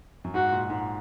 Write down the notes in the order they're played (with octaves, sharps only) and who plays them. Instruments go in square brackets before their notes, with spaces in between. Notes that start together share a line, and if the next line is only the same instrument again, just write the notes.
[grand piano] F#2
[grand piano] G#2 [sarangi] F#4
[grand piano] A#2
G#2